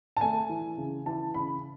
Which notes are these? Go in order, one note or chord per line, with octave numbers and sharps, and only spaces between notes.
A5
A3 G#5
E3
C#3
E3 A5
C#3 B5